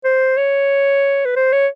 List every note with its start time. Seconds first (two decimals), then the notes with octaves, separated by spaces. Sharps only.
0.04 C5
0.37 C#5
1.25 B4
1.36 C5
1.52 C#5